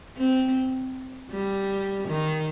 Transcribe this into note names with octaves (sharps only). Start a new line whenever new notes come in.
C4
G3
D#3